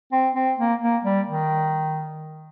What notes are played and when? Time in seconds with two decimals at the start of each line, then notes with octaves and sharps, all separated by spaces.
0.12 C4
0.35 C4
0.58 A#3
0.82 A#3
1.04 G3
1.28 D#3